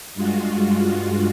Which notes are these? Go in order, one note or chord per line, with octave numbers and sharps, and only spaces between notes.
G2 G#3 F4 F#4